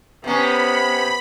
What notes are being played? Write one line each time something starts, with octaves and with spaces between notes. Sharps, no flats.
C3 B3 C#4 B5